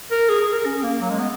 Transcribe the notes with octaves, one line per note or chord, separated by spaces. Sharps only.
A#4
G#4
G#4
A#4
C#4
A#3
F#3
G#3
B3